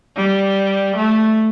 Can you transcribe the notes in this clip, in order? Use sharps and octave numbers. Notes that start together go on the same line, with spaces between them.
G3
A3